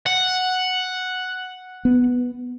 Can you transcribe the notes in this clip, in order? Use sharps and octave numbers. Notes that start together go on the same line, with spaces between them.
F#5
B3